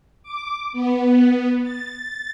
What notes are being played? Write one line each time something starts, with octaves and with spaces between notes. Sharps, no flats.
D6
B3
A6